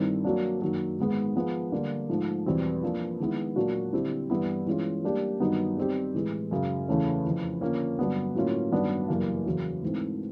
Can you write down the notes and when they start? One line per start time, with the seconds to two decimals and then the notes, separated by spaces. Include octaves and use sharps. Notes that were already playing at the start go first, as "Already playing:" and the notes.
Already playing: G2 D#3 G3 C4 E4
0.24 F#3 A#3 D4
0.61 F#2 D#3 F#3 A#3
0.99 G#2 D#3 G#3 B3
1.35 F3 G#3 B3
1.72 D3 G3 A#3
2.09 G#2 F3 A3
2.46 E2 B2 G3 C4
2.83 F3 A#3 D4
3.20 D#3 G#3 B3 E4
3.56 A#2 F#3 A#3 D4 F#4
3.93 D3 G3 C4 E4 G4
4.30 G2 E3 G3 B3 E4
4.67 E3 G#3 C#4 F4
5.04 G3 A#3 D4 G4
5.40 G2 D#3 F#3 B3 D#4
5.77 G3 C4 D#4 G4
6.14 A2 E3 G#3
6.51 F#2 C#3 F#3
6.88 E2 C#3 E3 A3 C#4
7.25 F2 C#3 E3
7.61 D3 F3 A#3 C#4
7.99 G2 D3 F#3 B3 D4
8.35 A2 F#3 A#3 C#4 F4
8.71 G2 D#3 F#3 B3 D4
9.08 F#2 C#3 E3 G3 A#3
9.46 E2 C#3 F#3
9.83 G#2 E3 A3 C4